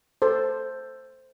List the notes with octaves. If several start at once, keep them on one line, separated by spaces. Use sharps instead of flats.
A4 C5